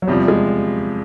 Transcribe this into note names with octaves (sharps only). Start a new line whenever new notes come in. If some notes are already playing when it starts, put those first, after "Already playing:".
F#3
E2 C3 F3 G3
G#3